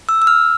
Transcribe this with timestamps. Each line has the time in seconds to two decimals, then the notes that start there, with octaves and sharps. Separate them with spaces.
0.09 E6
0.22 E6
0.27 F6